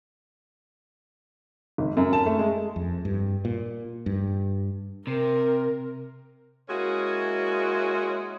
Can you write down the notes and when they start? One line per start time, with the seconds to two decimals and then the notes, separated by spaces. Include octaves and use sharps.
1.78 G#1
1.97 F#2
2.13 A5
2.26 A3
2.39 G#3
2.76 F2
3.05 G2
3.45 A#2
4.06 G2
5.07 C3 A#4
6.69 G#3 A#3 C#4 E4 F#4